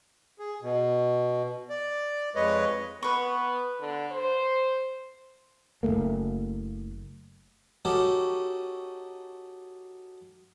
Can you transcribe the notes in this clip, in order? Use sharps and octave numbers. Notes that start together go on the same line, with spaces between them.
G#4
B2
D5
F2 G#3 B4 C#5 D#5
B3 B4 C#6
D3
C5
F#1 G#2 A3 A#3
C#4 D#4 F#4 G4 A4